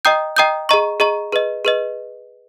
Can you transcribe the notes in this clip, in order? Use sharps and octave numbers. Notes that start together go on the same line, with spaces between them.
D#5 G5 A#5 D#6 G6
D#5 G5 A#5 D#6 G6
G#4 D#5 A#5 C#6
G#4 D#5 A#5 C#6
G#4 B4 D#5
G#4 B4 D#5